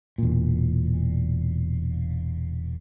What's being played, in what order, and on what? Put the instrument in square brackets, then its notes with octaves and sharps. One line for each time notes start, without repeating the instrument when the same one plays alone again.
[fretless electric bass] E1 A#2